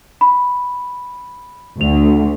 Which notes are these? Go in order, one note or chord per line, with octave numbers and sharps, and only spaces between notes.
B5
D2 F7